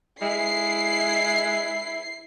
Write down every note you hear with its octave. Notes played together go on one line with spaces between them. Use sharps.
G#3 E4 C7